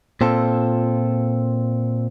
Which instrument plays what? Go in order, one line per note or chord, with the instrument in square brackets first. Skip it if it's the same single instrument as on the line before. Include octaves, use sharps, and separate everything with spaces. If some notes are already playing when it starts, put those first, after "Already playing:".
[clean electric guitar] A#2 C4 F4 A4